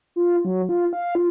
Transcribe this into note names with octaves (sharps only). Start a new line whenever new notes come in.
F4
F#3
F4
F5
F4